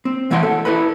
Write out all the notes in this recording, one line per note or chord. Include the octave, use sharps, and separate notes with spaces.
C4
B2 E3 A3 C#5 F#5 C6
A4
E4 A4 B4 B5